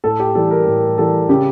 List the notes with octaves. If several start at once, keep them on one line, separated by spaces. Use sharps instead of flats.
A2 A4
G4
E3 G3 A4
A#4
A2
E3 G3 A4
C#3 G4